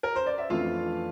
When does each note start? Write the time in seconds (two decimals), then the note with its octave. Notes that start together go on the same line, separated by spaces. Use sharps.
0.03 A#4
0.16 C5
0.27 D5
0.38 E5
0.50 F2 E3 A3 D4 F4 F5